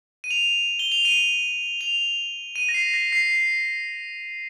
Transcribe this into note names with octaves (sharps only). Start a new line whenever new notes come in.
D#7
F7
G7
F7
D#7
F7
D#7
A#6
C7
A#6
C7